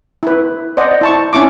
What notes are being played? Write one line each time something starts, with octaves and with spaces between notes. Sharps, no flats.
E4 B4
C5 D5 D#5 F#5
E4 A5 C#6
C#4 D4 E4 C#6 D6